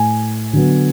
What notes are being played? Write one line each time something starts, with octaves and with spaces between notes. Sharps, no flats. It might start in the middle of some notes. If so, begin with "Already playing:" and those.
Already playing: A2 G#5
D3 F#3 B3